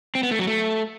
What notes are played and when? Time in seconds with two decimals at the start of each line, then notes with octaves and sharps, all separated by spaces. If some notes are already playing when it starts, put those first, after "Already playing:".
0.15 C4
0.23 B3
0.31 A3
0.39 F#3
0.47 A3